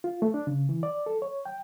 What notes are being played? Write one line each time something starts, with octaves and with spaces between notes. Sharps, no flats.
F4
A3
D4
C#3
E3
D5
A4
C#5
G5